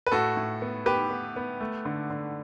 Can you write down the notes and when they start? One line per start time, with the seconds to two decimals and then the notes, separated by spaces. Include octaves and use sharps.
0.06 B4
0.12 A2 F#4 A4
0.37 A2
0.62 B3
0.86 B3 G4 B4
1.10 B3
1.36 B3
1.61 A3
1.85 D3
2.10 D3